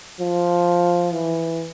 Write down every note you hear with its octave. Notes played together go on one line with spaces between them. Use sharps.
F3
E3